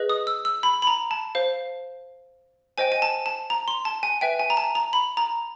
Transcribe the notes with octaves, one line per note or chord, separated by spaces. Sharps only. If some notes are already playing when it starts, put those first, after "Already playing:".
Already playing: G#4 B4 D#5
D#6
E6
E6
B5
B5
A#5
A5
C5 F5
C5 D#5 G5 G#5
G#5
A5
A5
A#5
C6
A5
G#5
B4 E5 G5
G#5
A#5
A5
A#5
B5
A#5